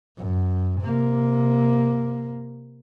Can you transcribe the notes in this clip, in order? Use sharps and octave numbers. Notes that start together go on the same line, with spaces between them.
F#2
C3 A#3